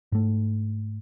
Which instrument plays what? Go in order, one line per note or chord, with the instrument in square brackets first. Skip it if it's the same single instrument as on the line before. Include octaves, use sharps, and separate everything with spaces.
[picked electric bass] G#2 A3